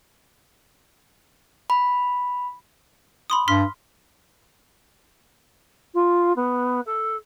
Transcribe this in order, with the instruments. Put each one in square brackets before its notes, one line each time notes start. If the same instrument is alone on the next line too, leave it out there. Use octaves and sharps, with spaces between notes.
[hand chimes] B5
[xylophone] B5 C6 D#6
[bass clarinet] G2 [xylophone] C6 F6 B6
[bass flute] F4
B3
A4